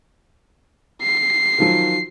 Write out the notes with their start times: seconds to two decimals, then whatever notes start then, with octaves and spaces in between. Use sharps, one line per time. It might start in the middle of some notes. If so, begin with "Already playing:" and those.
1.02 C7
1.59 D#3 F3 F#3